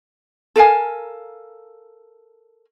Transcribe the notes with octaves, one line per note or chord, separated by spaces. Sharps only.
A4 A#4 F5 G#5